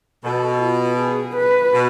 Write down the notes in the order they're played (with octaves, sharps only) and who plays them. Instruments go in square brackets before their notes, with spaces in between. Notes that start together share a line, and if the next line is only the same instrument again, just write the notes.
[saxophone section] B2 [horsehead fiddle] A4
[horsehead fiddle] F4
G#4
B4
[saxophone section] B2